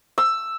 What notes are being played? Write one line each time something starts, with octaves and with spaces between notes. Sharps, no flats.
E6